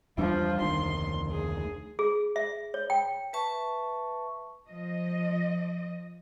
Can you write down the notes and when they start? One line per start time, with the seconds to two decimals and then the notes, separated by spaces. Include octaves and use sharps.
0.18 E2 F3 G3 D4
0.61 F1 D2 D#3 C6
1.31 G#4
1.99 G#4
2.36 E5
2.74 C#5
2.90 G5
3.33 B4 E5 A5 C#6
4.68 F3 D#5